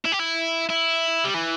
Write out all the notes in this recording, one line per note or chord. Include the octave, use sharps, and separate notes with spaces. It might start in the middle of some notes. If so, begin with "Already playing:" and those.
E4
G4
E4
E4
G3
E3